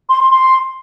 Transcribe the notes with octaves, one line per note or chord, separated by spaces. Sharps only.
C6
C6
C6